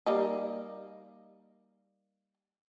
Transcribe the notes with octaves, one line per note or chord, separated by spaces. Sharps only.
G3 A#3 D#4